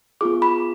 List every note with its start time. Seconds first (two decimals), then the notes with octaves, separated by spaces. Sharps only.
0.21 B3 F4 G#4 D6
0.42 B5